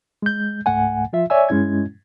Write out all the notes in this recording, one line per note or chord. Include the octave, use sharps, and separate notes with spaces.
G#3 G6
C#2 G#2 A3 F#5 G#5
F3 F4 E5
C#5 D5 E5 G#5 E6
G2 G#3 C#4 E4 G#6